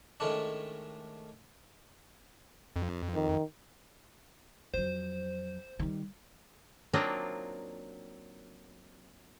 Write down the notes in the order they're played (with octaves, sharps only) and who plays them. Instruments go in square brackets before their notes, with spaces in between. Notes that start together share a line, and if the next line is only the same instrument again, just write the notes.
[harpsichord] A2 D#3 G#3 A3 C#4 D4
[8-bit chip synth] F2
[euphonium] D#3
[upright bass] F2 F#3 [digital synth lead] C5
[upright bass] D#3 G3
[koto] F#3 A#3 C4 D4 D#4 F4